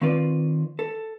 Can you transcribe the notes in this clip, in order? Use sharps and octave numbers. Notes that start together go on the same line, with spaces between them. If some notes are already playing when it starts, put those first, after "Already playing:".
D#3 C4 F4 B4 D5
A4